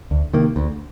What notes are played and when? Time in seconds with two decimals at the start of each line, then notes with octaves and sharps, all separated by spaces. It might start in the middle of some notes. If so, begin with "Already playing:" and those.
0.11 D2
0.33 C3 D#3 A#3
0.56 D2